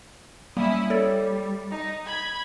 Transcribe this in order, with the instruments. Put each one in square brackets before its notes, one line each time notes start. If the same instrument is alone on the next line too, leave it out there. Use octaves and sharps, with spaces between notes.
[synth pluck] G3 A#3 [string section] C#4 E4 D#6
[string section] G3 [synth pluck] A4 C#5 D5
[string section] D#4
B5 G#6